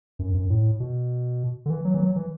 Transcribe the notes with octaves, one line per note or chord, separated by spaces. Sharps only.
F#2
F#2
A2
B2
D3
E3
F#3
E3
F#3
E3